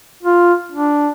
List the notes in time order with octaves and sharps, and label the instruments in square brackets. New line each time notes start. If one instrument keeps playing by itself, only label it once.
[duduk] F4
D4